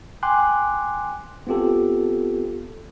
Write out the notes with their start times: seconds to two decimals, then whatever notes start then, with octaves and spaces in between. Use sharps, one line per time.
0.23 G5 G#5 C6 D6 F#6
1.47 B3 C4 F4 G4 A4